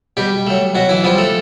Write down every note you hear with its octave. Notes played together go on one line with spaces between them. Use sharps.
B2 G3 G4
F#3 A3
B2 F#3 F#4
E3 E4
F3 G3 B3 F4
A3 A4